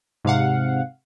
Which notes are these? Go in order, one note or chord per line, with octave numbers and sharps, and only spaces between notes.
G#2 C3 F5 F#5